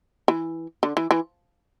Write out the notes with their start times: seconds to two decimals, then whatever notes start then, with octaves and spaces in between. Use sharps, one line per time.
0.28 E3
0.83 D3
0.97 E3
1.11 E3